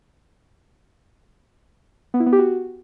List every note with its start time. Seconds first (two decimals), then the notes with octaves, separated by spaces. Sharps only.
2.14 B3
2.20 E4
2.26 B3
2.33 G4
2.39 F#4